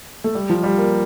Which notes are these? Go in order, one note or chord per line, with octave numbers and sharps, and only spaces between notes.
A3
G3
F3
G3
A#3